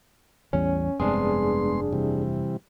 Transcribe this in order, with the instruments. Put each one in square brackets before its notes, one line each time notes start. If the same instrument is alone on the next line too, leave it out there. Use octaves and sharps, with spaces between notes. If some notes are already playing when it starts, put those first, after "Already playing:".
[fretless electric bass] A1 E2 G3 [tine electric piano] C#4
[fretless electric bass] F1 G2 C4 [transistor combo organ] G#3 B3 C6 [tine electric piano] D4 G#4
[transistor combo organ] C3 E3 G3